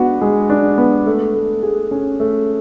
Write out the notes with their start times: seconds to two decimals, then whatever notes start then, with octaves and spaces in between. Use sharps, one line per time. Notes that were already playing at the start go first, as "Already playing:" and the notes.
Already playing: G#3 B3 D4 F#4
0.22 G#3
0.50 D4
0.78 B3
1.06 A3
1.35 A3
1.63 G#4
1.91 C#4
2.20 A3